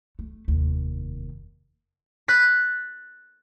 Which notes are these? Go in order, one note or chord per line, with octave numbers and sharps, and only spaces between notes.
A3
F1 D#2
F#6 A6 B6